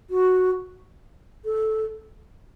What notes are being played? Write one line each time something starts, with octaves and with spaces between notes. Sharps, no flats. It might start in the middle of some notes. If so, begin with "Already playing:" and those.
F#4
A4